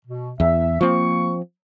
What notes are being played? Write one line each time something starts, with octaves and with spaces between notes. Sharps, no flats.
B2
E2 E5
F3 A#3 C4 C#6